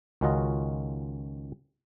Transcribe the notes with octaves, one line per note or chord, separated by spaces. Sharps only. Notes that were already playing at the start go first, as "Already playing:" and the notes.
C#2 D#3 C#4 F4 F#4 D#5